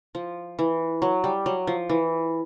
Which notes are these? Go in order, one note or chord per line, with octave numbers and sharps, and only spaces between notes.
F3
E3
F#3
G3
F#3
F3
E3